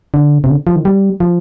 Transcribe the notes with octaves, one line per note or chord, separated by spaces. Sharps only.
D3
C3
D3
F3
D#3
G3
F3